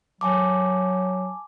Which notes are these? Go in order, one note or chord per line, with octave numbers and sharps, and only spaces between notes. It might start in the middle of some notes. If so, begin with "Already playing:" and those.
F#3 G#5 A5 D6